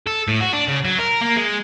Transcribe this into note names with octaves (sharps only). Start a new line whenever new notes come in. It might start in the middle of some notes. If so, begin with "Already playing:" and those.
A4
A2
F#4
D4
C#3
F#3
A#4
A#3
G#3